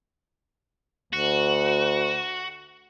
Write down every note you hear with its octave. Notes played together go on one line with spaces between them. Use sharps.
D2 F#4